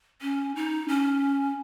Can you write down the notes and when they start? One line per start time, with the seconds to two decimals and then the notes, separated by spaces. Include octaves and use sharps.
0.22 C#4
0.56 D#4
0.88 C#4